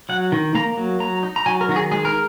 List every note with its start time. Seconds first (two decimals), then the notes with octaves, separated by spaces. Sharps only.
0.09 F#3 F#5
0.32 D#3
0.55 A#3 A#5
0.77 F#3
1.00 F#3 A#5
1.23 D#4
1.36 A#5
1.46 F#3 G#5
1.61 A#4
1.69 D#3 F#4
1.76 G#4
1.91 G#3 G#4
2.05 A#4